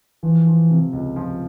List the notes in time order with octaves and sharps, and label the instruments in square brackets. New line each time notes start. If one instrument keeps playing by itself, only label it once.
[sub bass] E3 [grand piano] F3
[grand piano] F3
C3
C#2
F3